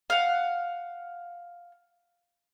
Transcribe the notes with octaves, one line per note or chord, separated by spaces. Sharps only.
F5 F#5